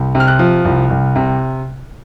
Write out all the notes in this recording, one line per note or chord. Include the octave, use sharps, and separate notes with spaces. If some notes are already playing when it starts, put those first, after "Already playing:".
Already playing: C2
C3
F6
F#6
F3
C2
C2
C3